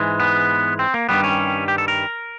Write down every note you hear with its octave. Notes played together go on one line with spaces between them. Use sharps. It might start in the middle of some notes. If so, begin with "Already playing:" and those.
Already playing: G#2 E3 G#3
B3
C4
A#3
G2 D#3 G3 B3
C#4
G4
A4
A#4